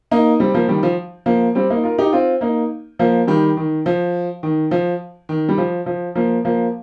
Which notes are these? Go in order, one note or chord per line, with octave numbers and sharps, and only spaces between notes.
A#3 D#4
G3 C4
F3 A#3
D#3 G3
F3
F3 A#3
G3 C4
A#3 D#4
F4 A#4
D#4 G4
C4 F4
A#3 D#4
F3 A#3
D#3 G3
D#3
F3
D#3
F3
D#3
G3
F3
F3
F3 A#3
F3 A#3